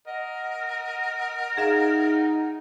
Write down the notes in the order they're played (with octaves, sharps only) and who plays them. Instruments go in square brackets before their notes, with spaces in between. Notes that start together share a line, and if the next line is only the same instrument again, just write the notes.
[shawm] A#4 [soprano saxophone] D#5 [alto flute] F#5
[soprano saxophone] D#4 [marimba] G#4 E5 F5